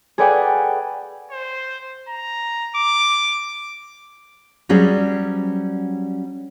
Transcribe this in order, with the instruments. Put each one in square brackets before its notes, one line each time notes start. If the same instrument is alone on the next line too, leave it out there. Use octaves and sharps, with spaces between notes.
[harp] G#4 A4 B4 D5 F#5 G5
[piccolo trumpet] C5
A#5
D6
[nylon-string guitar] F#3 G3 C#4 G#4 C5 D5